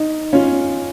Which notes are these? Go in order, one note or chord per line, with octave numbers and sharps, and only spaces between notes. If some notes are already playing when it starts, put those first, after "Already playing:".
Already playing: D#4
C#4 F4